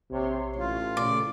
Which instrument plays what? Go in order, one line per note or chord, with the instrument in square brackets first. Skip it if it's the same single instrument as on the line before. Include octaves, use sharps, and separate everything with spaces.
[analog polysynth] A#1 C#5 C6 [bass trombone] C3
[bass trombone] A1 [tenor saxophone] F4
[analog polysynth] A#2 C#3 A3 [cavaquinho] D5